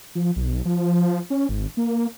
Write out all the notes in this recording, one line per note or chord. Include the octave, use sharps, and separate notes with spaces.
F3
B1
F3
C#4
G#1
A#3